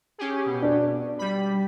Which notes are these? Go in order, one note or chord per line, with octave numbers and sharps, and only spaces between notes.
C#4 G4 G#4
B2
D4
G3 B5